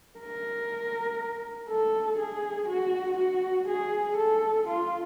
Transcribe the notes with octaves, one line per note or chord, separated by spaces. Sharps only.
A#4
A4
G#4
F#4
F#4
G#4
A4
F4